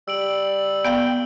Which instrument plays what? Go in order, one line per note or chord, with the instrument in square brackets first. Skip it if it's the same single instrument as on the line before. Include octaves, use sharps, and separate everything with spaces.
[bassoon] G3 [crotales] E6 D7 F#7
[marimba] B3 D5 F5 [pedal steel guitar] G5